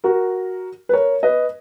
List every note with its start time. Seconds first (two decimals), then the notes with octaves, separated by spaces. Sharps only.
0.04 F#4 A#4
0.89 B4
0.93 A#4 C#5
1.23 B4 D#5